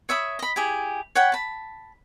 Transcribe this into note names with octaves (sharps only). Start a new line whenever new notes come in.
C#5 E5 B5 D#6
D#5 B5
E4 G4 G#4
C#5 F#5 G5 B5
A5 B5